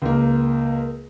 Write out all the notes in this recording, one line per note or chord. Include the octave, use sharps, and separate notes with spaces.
C#2 A#3